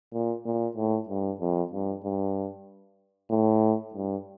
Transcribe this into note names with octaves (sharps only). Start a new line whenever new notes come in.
A#2
A#2
A2
G2
F2
G2
G2
A2
G2